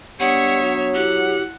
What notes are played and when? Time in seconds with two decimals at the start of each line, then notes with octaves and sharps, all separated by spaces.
0.20 G3 B3 D4 C#5 E5 F#5 D#6
0.63 F#3
0.95 E4 G4 F#5